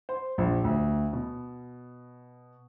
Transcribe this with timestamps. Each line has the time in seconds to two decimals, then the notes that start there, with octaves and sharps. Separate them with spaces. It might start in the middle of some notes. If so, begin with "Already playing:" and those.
0.09 C5
0.38 A#1
0.64 D2
1.13 B2